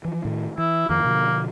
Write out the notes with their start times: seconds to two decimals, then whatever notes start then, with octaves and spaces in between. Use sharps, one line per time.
0.05 E3 F3
0.25 A2 D#3
0.58 E3 E4
0.89 F2 D#3 F3 A#3
1.05 B2 D3 F3